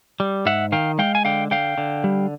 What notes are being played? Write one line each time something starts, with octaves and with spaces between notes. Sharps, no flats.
G3
G#2 E5 F#5
D#3 F5 G5
G#3 F5 G5
G#5
D3 F5 G5
D3 F5 G5
D3
G3